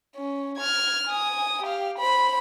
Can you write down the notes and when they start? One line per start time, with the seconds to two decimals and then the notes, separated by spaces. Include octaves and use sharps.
0.16 C#4
0.57 F6 G#6
1.07 G#5 D#6
1.62 G4 F5
1.98 C5 B5